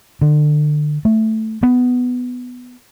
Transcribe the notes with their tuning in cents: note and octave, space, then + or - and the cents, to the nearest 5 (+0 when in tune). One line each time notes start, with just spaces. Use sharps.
D3 +30
A3 +0
B3 +10